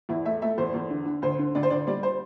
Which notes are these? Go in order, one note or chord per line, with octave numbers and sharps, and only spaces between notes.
E2 E4
A3 E5
A3 E5
E2 C5
E2
D3
D3
D2 C5
D3
D2 D5
C5
D2 D5
G3 D5
C5